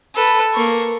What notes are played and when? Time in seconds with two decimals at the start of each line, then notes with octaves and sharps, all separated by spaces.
0.15 A4 B4
0.54 A#3 C#6